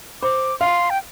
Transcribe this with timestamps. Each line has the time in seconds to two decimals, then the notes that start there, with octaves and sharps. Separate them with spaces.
0.22 C5 D6
0.60 F5 C6
0.90 G5